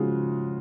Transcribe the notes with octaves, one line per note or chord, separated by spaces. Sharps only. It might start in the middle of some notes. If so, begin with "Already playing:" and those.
Already playing: C#3 F3 G#3 F4 F#4 G#4